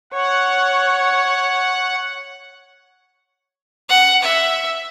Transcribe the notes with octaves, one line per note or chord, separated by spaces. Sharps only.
C#5 F#5
F#5
E5